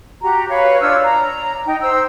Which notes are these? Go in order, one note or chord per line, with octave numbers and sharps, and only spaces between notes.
F#4 G4 A#5
B4 C#5 F5
D4 F4 C#5 E6
A#5
D#4 G5
C5 E6